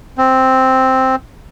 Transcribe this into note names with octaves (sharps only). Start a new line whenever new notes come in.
C4